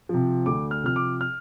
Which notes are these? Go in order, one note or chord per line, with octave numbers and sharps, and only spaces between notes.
C3 F3
D2 D6
F6
C3 F3 F6
D6
F6